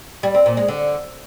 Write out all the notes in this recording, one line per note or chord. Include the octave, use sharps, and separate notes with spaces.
G3
C4
A#2
G#3
D3